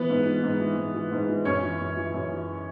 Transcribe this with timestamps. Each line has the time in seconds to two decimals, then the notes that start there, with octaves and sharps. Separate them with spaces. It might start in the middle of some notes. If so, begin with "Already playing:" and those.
Already playing: E3 B3 B4
0.09 G#2
0.26 E3
0.43 G#2
0.60 E3
0.77 G#2
0.94 E3
1.12 G#2
1.29 E3
1.45 F#2 C#4 C#5
1.63 E3
1.79 F#2
1.97 E3
2.14 F#2
2.31 E3